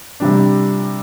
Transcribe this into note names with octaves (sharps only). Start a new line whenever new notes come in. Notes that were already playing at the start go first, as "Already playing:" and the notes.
C3 G3 D4